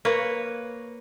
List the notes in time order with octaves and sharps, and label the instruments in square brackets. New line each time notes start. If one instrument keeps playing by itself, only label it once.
[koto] A#3 B4 C#5